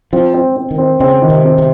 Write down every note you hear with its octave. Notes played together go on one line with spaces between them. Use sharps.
F3 C4
C4
C4
D#3
C4
C#3 C4
D#3
C3
C4
C3